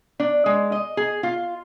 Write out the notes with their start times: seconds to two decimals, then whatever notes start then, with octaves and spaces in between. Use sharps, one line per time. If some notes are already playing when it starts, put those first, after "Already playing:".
0.20 D4
0.46 G#3
0.72 D#5
0.97 G#4
1.23 F4